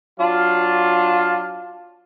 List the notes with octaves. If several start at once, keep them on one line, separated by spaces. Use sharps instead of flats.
F#3 D4 F4